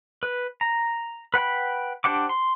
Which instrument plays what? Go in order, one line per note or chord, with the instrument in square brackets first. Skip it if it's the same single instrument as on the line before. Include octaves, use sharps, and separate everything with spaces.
[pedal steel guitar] B4
A#5
B4 F#5 G5 B5
D4 G4 C5 F#5 D6
C6